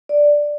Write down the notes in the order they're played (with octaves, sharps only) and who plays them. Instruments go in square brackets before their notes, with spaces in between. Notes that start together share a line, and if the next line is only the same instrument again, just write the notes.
[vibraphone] D5